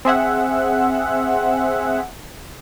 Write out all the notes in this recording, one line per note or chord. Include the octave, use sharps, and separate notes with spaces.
C4 G#4 E5 F#5